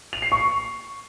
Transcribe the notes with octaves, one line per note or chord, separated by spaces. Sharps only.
F7
C7
C#6